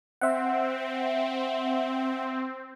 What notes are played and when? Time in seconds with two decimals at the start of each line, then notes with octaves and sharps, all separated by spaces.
0.21 C4 E5 F#5